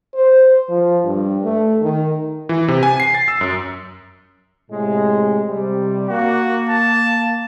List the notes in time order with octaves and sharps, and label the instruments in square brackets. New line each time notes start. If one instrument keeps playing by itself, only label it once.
[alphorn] C5
F3
G2
A3
D#3
[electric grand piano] E3
C3
G#5
C7
A6
E6
F#2
[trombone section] A2 C3 G#3
C3 G3
[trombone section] A#3 [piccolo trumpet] F#4
[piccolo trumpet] A5